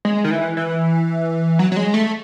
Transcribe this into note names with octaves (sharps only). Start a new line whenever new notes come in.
G#3
D#3
E3
E3
F#3
F#3
G#3
A3